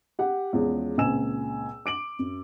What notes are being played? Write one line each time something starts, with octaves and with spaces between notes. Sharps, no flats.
G4 F#5
E2 F3 G#3 C#4
C#2 A#2 C4 G#5 E6 E7
D6 D7 F#7
F#2